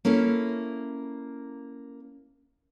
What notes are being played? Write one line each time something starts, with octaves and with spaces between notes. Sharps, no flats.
A#3 C#4 E4 A4